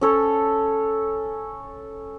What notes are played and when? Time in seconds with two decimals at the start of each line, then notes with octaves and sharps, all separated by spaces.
0.01 C#4 A4 C#5